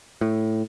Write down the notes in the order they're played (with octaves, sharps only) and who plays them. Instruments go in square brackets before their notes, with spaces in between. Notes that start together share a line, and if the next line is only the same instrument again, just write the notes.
[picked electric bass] A2